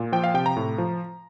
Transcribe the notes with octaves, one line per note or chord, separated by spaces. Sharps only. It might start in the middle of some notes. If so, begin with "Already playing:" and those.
Already playing: A#2
F3 G5
F5
C3 G5
A#5
A2
F3